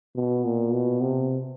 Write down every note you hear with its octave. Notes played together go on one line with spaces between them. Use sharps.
B2
A#2
B2
C3